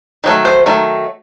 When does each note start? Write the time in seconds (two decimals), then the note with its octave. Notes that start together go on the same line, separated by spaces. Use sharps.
0.24 D#3 F#3 A3
0.45 C5
0.66 D#3 F#3 A3